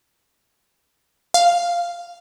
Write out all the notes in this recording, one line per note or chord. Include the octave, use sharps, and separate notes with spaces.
F5